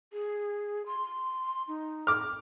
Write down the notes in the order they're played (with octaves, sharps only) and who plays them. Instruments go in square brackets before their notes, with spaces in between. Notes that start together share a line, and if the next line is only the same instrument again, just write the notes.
[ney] G#4
C6
D#4
[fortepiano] D6 F6